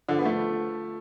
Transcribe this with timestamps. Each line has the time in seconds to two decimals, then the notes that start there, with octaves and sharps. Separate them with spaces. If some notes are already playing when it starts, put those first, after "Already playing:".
0.09 D3 F3
0.19 B3
0.25 F3 A3